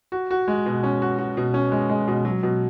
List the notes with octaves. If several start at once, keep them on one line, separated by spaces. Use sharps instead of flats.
F#4
F#4
G#3
B2
C#4
F#4
F#4
B2
C#4
G#3
G#3
B2
F#3
B2